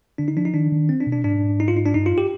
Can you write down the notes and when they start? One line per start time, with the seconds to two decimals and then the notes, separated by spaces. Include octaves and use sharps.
0.18 D3 D4
0.28 D#4
0.36 F3 D4
0.45 D#4
0.54 D#3 D4
0.72 D#3
0.89 C4
1.01 D4
1.07 B2
1.12 D4
1.24 G#2 D4
1.60 D#4
1.68 F4
1.77 D#4
1.85 D4
1.94 G2 D#4
2.06 F4
2.18 G4